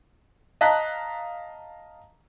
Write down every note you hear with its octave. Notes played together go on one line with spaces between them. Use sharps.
D#5 F5 A5 A#5 F#6 B6